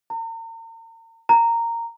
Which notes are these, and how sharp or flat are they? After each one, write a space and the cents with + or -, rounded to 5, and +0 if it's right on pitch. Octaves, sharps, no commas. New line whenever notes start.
A#5 -40
A#5 -10